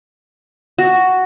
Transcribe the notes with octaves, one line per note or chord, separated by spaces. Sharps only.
F#4